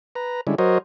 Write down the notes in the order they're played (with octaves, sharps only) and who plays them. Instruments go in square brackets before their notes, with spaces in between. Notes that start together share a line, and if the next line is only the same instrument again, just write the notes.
[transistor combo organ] B4 A#5
D3 G3 G#3 C#4 E4
F#3 F#4 A#4 C5 C#5 D#5